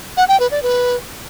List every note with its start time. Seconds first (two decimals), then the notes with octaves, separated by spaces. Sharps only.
0.17 F#5
0.29 G5
0.40 B4
0.51 D5
0.63 B4